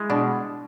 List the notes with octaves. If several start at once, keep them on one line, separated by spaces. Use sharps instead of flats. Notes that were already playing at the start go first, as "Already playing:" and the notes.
Already playing: G#3 E4
B2 D4